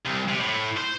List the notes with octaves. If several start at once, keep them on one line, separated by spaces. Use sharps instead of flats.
C2
C3
A2
C5